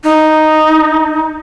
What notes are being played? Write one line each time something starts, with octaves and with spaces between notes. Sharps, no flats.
D#4